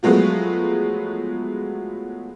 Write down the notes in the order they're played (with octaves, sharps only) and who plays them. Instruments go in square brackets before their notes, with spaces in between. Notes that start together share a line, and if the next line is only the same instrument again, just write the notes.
[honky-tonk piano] F3 F#3 G#3 A3 B3